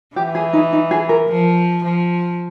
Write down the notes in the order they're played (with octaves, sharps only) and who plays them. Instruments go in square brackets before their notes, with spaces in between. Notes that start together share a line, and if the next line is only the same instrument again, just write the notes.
[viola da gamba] E3 [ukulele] G4
[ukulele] G#4
D#4
D#4
G#4
A#4
[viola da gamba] F3
F3